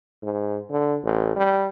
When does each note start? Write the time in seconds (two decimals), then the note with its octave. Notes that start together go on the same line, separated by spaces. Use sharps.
0.23 G#2
0.71 D3
1.04 A1
1.36 G3